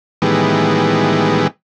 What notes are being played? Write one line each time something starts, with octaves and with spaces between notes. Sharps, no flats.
A2 D#3 E3 G3 G#3 B3